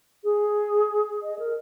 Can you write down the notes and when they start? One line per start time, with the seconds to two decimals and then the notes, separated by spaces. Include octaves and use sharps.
0.24 G#4
1.22 D#5
1.39 A#4